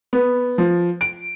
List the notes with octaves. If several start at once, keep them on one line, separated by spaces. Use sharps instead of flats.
B3
F3
D7